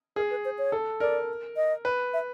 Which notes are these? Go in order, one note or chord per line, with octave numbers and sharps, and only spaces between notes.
G#4 A#4
B4
C5
C#5
A4
A#4 D5
D#5
B4
E5